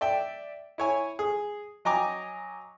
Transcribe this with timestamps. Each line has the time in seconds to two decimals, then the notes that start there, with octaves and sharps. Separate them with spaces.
0.01 D5 E5 G5
0.78 E4 C#5 G#5
1.19 G#4
1.85 F#3 D#5 G5 G#5 A#5 D6